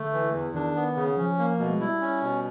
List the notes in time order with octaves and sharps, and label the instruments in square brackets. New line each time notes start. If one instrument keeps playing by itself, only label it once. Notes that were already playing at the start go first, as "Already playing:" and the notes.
Already playing: [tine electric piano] D3 [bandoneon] A3
[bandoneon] E3
E2
[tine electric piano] D#3 [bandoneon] D4
[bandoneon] B3
C#3
[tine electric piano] F3 [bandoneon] C#4
[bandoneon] A#3
[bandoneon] B2 [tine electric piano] A3
[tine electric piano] G#3
[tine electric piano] G3 [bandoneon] E4
[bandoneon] C#4
B2